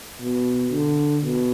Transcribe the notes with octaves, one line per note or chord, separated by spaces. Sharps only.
B2
D3
B2